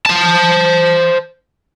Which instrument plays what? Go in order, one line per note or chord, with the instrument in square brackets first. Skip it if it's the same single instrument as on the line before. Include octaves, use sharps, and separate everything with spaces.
[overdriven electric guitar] C5 A5